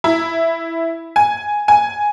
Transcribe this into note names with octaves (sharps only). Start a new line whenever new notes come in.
E4
G#5
G#5